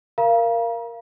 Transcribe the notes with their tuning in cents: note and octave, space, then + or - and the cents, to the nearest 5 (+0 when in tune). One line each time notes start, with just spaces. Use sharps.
A#4 +0 F5 -20 A#5 +35